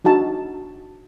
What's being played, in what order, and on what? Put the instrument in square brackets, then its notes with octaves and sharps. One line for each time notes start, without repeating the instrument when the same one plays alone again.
[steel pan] D4 D#4 F#4 A5